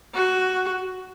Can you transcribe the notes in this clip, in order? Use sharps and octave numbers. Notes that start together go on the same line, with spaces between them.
F#4